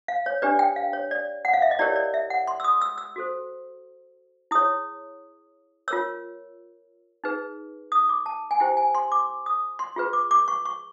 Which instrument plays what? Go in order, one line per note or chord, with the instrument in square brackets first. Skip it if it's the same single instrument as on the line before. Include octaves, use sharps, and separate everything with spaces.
[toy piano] F5
C#5
D4 G4 B4 D5
G5
F5
C#5
D5
F#5
F5
E5
D#5
E4 G4 A#4 C#5 D5
D5
E5
F#5
C6
E6
D#6
E6
E6
F#4 A4 C5
E4 G#4 C#5 D#6
F4 A#4 C#5 E6
D#4 G#4 B4
D#6
D6
A5
G#5
E4 G4 C5 G5
G#5
C6
D6
D#6
C6
F4 G#4 B4
D6
D6
C#6
C#6